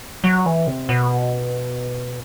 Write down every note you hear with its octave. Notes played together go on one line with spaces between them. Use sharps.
F#3
E3
C3
B2